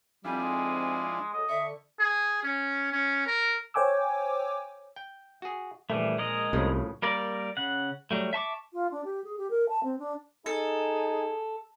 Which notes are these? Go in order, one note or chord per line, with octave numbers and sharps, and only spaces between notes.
F2 G#2 F3 G3 C4 D4 E4 G#5
G#3
F#3 G#3 A4 D#5
D3 E5 C#6
G#4
C#4
C#4
A#4
C5 C#5 G5 G#5 D6 E6
G5
F#4 G#4
A#1 E3 G3 A3
G#3 A#4 D#5
C2 A2 C#3 F3
G3 A#3 A#4 D5
C#3 F#5
F#3 G3 A3
E5 A5 C#6 D6
F4
D4
G4
G#4
G4
A#4
A5
C4
D4
D#4 G#4 A4